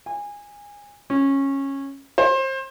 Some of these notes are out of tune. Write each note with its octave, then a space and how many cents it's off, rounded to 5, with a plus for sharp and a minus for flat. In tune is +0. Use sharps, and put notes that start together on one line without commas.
G#5 -20
C#4 -15
C5 +30